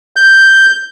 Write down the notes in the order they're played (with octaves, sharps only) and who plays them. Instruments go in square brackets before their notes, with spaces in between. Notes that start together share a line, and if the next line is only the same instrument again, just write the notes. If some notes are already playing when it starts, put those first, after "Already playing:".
[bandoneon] G6